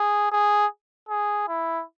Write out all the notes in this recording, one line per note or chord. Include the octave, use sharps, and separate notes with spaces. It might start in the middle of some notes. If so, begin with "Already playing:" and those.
Already playing: G#4
G#4
G#4
E4